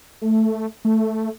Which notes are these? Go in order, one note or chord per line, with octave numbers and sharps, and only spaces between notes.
A3
A3